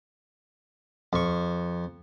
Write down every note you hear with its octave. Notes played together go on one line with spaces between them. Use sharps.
F2 C#6